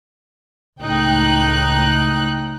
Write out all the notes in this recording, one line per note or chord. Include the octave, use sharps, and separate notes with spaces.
C#2 A2 D#4 G5 F#6